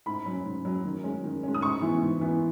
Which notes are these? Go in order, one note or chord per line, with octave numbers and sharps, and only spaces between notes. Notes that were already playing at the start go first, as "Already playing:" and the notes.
G#2 B5
F#3 C#4
G#2
F#3 C#4
D#3
G#3 C#4
D#3
G#3 C#4
D#6
G#2 C#6
E3 B3
G#2
E3 B3